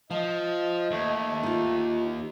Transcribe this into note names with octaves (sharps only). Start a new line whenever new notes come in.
F3 D#5 F5 A5
D#2 A3
D#4 F4